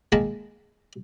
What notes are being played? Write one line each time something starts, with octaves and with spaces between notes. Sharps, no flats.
D#3 G#3 A#3 A5 B5